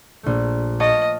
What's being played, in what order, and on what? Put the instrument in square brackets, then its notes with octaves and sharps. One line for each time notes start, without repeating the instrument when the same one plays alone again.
[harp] A#1 A3
[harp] C#5 F5 A5 [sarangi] D#5